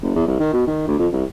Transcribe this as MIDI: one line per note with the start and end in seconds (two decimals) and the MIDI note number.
0.03 0.14 30
0.15 0.25 40
0.27 0.38 36
0.40 0.51 51
0.53 0.63 47
0.67 0.87 51
0.87 0.98 38
0.99 1.07 41
1.13 1.24 36